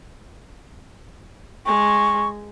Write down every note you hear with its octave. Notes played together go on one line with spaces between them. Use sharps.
G#3 C#6